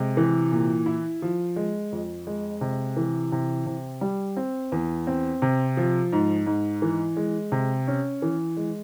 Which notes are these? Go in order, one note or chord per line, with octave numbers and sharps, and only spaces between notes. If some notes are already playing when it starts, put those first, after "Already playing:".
Already playing: C3 G#3
E3
A#2
E4
F3
G#3
F2
G#3
C3
E3
C3
C3
G3
C4
E2
C4
C3
F3
G#2
G#2
E3
G#3
C3
C#4
E3
G#3